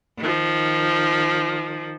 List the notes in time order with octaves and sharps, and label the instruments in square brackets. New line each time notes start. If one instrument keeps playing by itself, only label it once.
[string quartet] D#3 F3